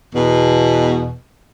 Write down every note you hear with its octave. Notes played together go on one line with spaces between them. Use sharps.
E2 B2